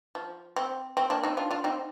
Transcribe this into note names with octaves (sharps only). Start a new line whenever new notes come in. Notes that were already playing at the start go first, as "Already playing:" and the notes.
F3
C4
C4
A#3 D4
C4 D#4
D4 F4
D4 F4
C4 D#4